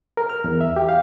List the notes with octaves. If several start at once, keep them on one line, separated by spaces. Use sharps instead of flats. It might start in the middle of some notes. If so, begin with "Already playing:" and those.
A#4
F6
E2
E5
G4
F5